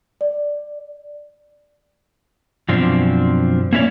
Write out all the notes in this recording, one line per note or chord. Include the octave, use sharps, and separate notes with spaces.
D5
F#2 B2 F3 C4 D4
A#3 C#4 E4 F4 C#5 D5